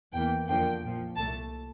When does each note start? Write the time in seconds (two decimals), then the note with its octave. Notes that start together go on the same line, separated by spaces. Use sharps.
0.14 E2 E3 A#3 G5
0.48 F2 D3 F3 A#3 G5
0.82 A#1 A#2 F3
1.16 C2 A#2 A3 A5